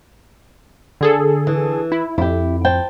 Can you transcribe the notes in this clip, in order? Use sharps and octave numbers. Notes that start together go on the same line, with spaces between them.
D3 G#4 A4
E3
E4
F2 E4 G4
C5 G5 A5